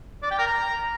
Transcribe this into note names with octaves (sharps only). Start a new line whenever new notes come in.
D5
G5
A#4
A#5